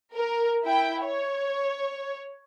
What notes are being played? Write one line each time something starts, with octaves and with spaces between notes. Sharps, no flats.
A#4
E4 G5
C#5